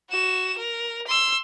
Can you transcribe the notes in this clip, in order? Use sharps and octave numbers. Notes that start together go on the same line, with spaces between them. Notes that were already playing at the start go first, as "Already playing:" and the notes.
F#4 E7
A#4
C6 E6